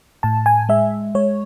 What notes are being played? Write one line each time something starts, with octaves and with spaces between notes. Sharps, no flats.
A2 A5
G#5
G#3 E5
G#3 C#5